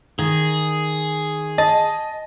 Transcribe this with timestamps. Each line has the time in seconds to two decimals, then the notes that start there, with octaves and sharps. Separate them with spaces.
0.19 D#3 G#4
1.58 D#5 A5